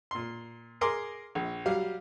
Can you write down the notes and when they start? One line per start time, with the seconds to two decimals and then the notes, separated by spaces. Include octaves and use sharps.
0.11 A#2 C6
0.81 G#4 A#4 C6 D6
1.35 A#1
1.66 F#3 G3 F5